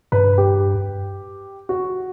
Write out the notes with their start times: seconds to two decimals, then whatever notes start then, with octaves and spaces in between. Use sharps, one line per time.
0.12 G2 B4
0.38 G4
1.69 F#4